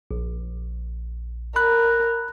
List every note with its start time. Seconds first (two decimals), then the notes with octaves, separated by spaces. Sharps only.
0.11 A#1
1.56 A#4 B5 F#6